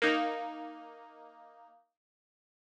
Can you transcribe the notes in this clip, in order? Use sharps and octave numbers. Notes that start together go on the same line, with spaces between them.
A#3 D#4